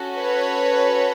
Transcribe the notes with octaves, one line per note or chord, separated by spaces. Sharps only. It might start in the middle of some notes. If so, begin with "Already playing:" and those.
Already playing: C#4 F#4 A4
B4 C#5